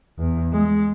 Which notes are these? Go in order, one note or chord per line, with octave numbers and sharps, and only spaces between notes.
E2
G#3